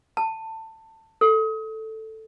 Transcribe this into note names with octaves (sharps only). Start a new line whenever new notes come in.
A5
A4